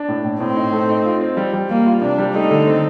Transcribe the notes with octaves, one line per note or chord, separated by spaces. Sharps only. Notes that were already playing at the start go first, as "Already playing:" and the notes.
Already playing: D4
A2
A2
A2 C4
D#4
A3
D#4
F4
C4
G3
G3
G3 A#3
F4
C3 D4
G3
A3 D#4
D3
C4